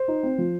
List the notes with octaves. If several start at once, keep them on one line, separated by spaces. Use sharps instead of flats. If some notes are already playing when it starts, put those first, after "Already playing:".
Already playing: C5
D#4
C4
F3